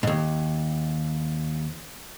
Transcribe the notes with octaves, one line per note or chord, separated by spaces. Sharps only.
D#2 G#2